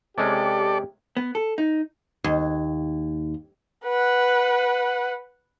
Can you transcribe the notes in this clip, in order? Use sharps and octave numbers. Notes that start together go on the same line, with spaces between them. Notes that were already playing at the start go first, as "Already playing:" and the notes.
C3 G#3 C#4 G4 A4 D5
B3
A4
D#4
D#2
B4 F#5